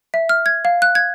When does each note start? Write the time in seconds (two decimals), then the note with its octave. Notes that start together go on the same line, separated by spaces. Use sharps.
0.14 E5
0.29 F6
0.46 G#6
0.65 F5
0.82 F#6
0.95 G#6